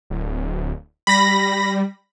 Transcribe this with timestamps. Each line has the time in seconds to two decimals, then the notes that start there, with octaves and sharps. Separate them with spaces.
0.10 D1
1.07 G3 B5 A#6